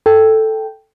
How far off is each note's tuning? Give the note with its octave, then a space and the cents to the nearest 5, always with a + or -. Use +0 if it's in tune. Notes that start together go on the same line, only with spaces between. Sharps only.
A4 +0 G5 +0